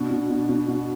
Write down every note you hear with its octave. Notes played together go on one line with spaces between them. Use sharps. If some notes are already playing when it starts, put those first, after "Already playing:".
Already playing: B2 D4
B2
B2
B2
B2